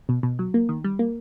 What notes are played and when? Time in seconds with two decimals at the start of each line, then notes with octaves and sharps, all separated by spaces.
0.09 B2
0.23 B2
0.39 F#3
0.54 A#3
0.69 D#3
0.84 G3
0.99 A#3